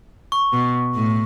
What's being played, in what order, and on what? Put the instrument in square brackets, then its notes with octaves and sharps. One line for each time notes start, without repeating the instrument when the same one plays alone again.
[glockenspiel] C#6
[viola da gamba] B2
A2